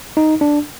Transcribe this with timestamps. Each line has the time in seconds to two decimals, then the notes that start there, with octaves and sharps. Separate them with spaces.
0.17 D#4
0.41 D4